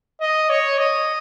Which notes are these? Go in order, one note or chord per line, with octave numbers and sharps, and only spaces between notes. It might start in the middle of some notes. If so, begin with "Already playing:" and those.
D#5
C#5
D#5